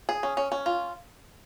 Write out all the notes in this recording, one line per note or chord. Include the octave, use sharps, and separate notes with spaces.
G#4
C#4
C#4
C#4
F4